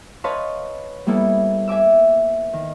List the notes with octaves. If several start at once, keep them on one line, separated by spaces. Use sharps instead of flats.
B4 C#5 D#5 F5 A5 C6
G3 A#3 B3 E4 A4
E5 G#5 D6 E6
D#3